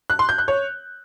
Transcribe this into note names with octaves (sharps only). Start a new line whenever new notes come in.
F#6
C6
G6
F#6
C#5